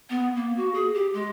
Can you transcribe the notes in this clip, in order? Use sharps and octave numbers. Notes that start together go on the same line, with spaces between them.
B3
A#3
F#4
G#4
G4
G#3